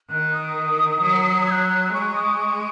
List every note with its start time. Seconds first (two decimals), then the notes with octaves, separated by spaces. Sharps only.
0.10 D#3 F#6
0.33 D#6
1.02 F#3
1.47 G#6
1.51 F#6
1.93 G#3 C#6
2.16 D#6
2.38 D#6
2.42 C#6